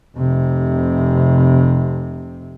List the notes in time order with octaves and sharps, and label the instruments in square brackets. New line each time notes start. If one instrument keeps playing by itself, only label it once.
[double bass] F1 C3